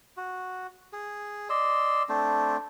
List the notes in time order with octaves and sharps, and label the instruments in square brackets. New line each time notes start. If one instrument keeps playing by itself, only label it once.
[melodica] F#4
G#4
D5 D#5 C6 E6
A3 C4 D4 C5